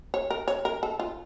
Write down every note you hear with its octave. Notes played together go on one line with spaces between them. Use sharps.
C#5
A#4
C#5
A#4
A4
F4